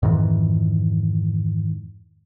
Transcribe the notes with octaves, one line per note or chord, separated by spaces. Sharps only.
F2 G#2 D#3 E3